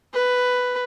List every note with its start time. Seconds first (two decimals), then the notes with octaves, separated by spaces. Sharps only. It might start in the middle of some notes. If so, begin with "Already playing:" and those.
0.14 B4